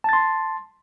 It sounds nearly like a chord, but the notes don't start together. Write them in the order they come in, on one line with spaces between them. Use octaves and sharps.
A5 A6 C6